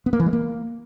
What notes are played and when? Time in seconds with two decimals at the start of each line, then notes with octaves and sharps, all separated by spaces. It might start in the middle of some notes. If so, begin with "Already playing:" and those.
0.06 B3
0.13 A#3
0.20 E3
0.26 G#3
0.33 A#3